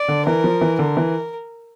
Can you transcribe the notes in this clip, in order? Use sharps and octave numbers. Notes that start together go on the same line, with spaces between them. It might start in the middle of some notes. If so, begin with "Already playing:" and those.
Already playing: D5
D3
E3 A#4
F3
E3
D3 A#4
E3